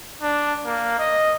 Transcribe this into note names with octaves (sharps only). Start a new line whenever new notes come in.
D4
A#3
D#5